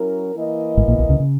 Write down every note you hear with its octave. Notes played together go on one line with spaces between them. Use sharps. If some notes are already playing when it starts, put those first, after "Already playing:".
Already playing: F#3 C#4 E4 A#4
E3 A#3 E4 A#4 D#5
G#1 G#2
A#1 A#2
B1 B2
C#2 C#3
C#3